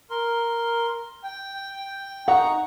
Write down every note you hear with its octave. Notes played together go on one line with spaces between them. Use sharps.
A#4 C6
G5
D#4 F#5 A#5 C#6